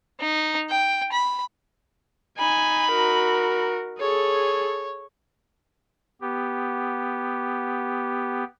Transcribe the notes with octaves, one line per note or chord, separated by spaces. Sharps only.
D#4
G5
B5
D#4 G#5 B5
F#4 A#4
G#4 A4 C#5
B3 G4